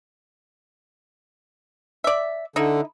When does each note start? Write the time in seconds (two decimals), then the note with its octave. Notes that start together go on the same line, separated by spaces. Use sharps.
2.04 D5 E5
2.56 D3 D#4 E4